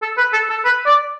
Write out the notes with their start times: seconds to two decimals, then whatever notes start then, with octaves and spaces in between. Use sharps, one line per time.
0.02 A4
0.17 B4
0.33 A4
0.50 A4
0.65 B4
0.86 D5